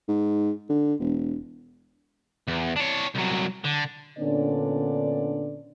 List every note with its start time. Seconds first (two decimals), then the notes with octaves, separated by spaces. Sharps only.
0.08 G#2
0.69 D3
1.00 E1
2.48 E2
2.77 D4 C#5
3.15 C2 F#3
3.65 D3
4.19 A#2 D3 B3 C#4 D4 D5